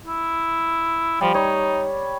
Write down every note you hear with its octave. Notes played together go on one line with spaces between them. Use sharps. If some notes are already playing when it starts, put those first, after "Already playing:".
E4
F3 G3
D#4 C#5